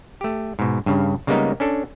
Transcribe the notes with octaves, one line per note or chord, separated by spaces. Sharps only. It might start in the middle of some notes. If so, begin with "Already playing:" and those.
A3 G4
G#2 B2
G2 C#3
C#3 G3 G#3 A#3 B3 D#4
C#4 D4 A4